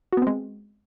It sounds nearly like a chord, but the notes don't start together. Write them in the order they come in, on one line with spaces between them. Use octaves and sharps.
F#4 B3 C4 G#3